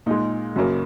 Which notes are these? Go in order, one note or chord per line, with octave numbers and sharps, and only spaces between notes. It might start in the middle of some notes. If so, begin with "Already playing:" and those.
A#2 G#3 D#4
F#2 C#3 F#3 A#3